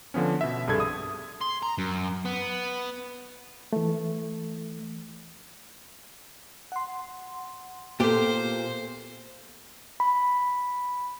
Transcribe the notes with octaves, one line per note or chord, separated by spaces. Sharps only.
D3 F3 B3 C#4
B2 E5
C2 G2 G#4 A4 G#6
D#6
C6
A#5
F#2
B3
E3 A3
F#5 C6
A#2 B3 G4 A4 C5
B5